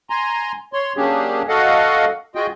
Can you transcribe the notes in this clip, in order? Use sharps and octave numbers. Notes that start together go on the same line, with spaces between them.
G#5 A#5 C6
C#5 C6
F#3 A#3 C#4 D4 G4 G#4
F#4 A4 D#5 F5 F#5
F4 F#4 G#4 D#5 G5